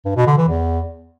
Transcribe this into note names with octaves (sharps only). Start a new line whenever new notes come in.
G2
B2
D3
E3
E2